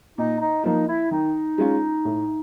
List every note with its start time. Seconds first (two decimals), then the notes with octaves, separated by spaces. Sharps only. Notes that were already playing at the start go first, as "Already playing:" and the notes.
0.18 A#2 D#4
0.40 D#4
0.64 F3 A#3 D#4
0.87 E4
1.11 D#3 D#4
1.58 G#3 C#4 F4
2.05 A2